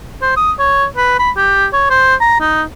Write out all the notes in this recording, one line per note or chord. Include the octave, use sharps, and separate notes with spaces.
C5
D#6
C#5
B4
B5
G4
C#5
C5
A#5
D#4